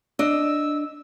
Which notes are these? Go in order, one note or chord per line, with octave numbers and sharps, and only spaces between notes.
D4 D#5 E6